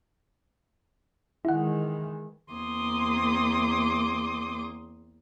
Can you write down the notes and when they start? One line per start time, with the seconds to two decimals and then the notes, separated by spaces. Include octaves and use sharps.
1.45 D#3 E3 G#3 E4 F#5
2.51 E2 A#3 C4 C6 D6 D#6